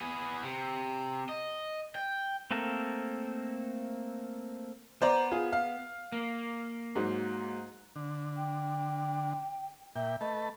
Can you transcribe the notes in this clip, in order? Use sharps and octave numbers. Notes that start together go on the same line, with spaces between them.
B3 G#4
C3
D#5
G5
A3 A#3 C4 A4 A#4
B3 C5 D5 A#5
F4 G#4
F5
A#3
G#2 F#3
D3
G5
A#2 E5 G5
A3 B4 D#5 A5